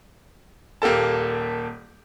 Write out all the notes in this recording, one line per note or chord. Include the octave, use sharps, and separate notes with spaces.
D#1 A#3 G4 A4 A5